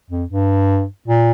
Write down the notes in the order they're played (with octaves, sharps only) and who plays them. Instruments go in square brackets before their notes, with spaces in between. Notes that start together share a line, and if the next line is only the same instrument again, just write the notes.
[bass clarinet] F2
G2
A#2